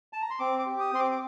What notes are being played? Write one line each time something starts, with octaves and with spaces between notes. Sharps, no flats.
A5
A#5
C6
C4 D6
D6
G4
D#6
C4 C6
D6
D6